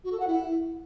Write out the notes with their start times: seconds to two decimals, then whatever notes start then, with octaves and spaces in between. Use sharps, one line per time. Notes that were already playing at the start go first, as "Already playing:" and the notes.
0.04 F#4
0.12 A4
0.20 F#5
0.27 E4